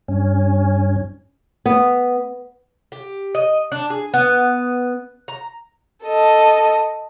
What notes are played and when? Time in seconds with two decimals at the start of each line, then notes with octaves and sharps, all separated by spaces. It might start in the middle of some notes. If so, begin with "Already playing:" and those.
0.08 G2 C#4
1.66 B3
2.92 G4
3.35 D#5
3.72 D4
3.90 G#4
4.14 B3
5.28 A#5
6.04 A4 D#5